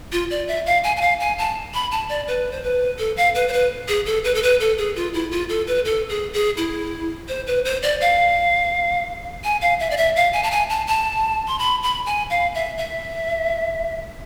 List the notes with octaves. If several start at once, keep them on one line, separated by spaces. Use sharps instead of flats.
F4
D5
E5
F5
G#5
G#5
F5
G#5
A5
B5
A5
D5
B4
C5
B4
A4
F5
B4
C5
B4
G#4
A4
B4
A4
B4
A4
G#4
F4
E4
F4
A4
B4
A4
G#4
G#4
E4
C5
B4
C5
D5
F5
G#5
F5
E5
D5
E5
F5
G#5
A5
G#5
A5
A5
C6
B5
B5
G#5
F5
E5
E5